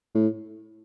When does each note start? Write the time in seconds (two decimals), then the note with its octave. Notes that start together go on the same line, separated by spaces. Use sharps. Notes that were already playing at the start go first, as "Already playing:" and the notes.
0.15 A2